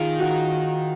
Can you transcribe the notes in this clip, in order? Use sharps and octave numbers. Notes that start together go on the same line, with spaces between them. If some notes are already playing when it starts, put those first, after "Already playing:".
Already playing: D#3 F4 G#4
F#4